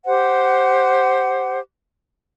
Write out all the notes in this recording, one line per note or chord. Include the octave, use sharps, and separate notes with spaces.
G4 C5 F#5